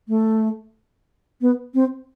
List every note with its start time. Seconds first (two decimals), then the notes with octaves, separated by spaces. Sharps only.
0.08 A3
1.41 B3
1.74 C4